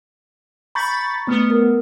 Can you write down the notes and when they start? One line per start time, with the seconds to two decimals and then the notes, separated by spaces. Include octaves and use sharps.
0.75 A#5 B5 C#6 G6 A6 B6
1.27 A3 B3 F6
1.50 A#4